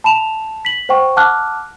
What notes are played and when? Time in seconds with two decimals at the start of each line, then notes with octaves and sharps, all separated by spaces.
0.04 A5 B5 E7 F7
0.65 B6 F#7
0.89 C5 F#5 G5 C#6
1.17 F#5 A5 D6 F6 F#6